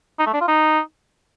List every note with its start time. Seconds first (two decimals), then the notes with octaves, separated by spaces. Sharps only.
0.19 D#4
0.26 A3
0.34 D4
0.41 F4
0.48 D#4